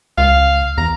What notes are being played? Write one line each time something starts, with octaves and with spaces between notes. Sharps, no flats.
C#2 F5
E2 A#5